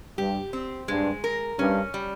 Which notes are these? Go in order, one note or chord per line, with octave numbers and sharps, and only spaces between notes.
G2 G4
C4
G2 G#3
A#4
G2 C#4
G3